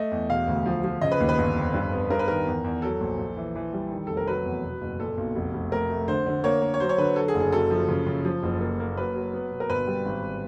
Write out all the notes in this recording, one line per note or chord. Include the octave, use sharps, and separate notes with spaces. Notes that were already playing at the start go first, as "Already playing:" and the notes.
Already playing: A3 D#5
E2
E1 F5
D2
F3
F3
C#3 D#5
B4
D#2
B4
G1
F2
G2
B3
G2 A#4
B4
D#3 A#4
E2
E2
F#3 A4
A#1
A#1
E3
E3
G3
D#3
F1 A4
A#4
F#3 B4
E2
B2
F#1
A#2 A4
B1
F1
F1
A3 A#4
A3
D3 C5
D3
A#3 C#5
A#3
C#5
F#3 C5
C#5
D3 B4
F#3 A4
G#4
F#1
G#4
F#2 A4
F3
C#3
C#3
F3
F#1
A#3
A#3
F#3 B4
F#3
B3
B2
A#4
G1 B4
G3
G#1